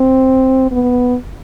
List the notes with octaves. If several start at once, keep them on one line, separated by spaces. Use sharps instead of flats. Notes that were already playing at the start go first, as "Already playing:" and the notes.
Already playing: C4
B3